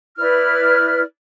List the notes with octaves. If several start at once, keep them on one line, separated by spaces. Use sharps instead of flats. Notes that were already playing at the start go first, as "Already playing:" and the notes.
E4 B4 D5 F6